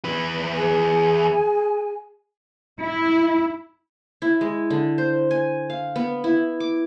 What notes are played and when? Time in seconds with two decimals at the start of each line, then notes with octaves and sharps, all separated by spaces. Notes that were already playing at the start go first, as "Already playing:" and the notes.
0.05 E2 B4
0.56 G#4 G#5
2.81 E4
4.22 E4
4.41 G#3
4.70 D3
4.98 C5
5.31 G#5
5.70 F5
5.96 B3
6.24 E4
6.60 D6